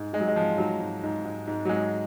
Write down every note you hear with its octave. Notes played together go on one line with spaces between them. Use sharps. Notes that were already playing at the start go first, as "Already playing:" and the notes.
Already playing: G#2
G#2 G#3
F#3
G#3
G#2 F3
G#2 F#3
G#2
G#2
G#2
G#2
F#3
G#2 G#3